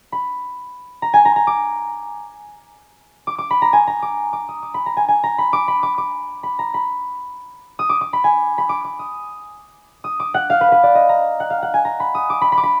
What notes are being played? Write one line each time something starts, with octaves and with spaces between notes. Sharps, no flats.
B5
A#5
G#5
A#5
A#5
D6
D6
D6
B5
A#5
G#5
A#5
D6
D6
D#6
D6
B5
A#5
G#5
G#5
A#5
B5
D6
B5
D6
D6
B5
A#5
B5
D#6
D6
D6
B5
G#5
B5
D6
D6
D#6
D#6
D6
F#5
F5
B4
B4
D5
D#5
A#5
F#5
F5
F#5
G#5
A#5
B5
D#6
D6
B5
B5
D6
B5